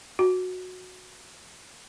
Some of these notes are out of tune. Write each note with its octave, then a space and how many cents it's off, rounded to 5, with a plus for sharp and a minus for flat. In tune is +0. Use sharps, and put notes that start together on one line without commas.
F#4 -10